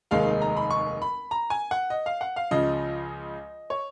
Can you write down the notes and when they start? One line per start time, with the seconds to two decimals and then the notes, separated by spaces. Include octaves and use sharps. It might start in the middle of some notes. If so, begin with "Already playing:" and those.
0.11 F1 D#2 D#3 G#3 D#4 F5
0.42 A#5
0.57 B5
0.71 C#6
1.02 B5
1.31 A#5
1.50 G#5
1.71 F#5
1.90 D#5
2.06 F5
2.21 F#5
2.36 F5
2.51 C#2 C#3 F3 D#5
3.70 C#5